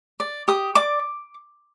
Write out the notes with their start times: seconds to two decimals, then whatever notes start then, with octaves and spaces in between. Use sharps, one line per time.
0.20 D5
0.48 G4 D#6
0.75 D5 D6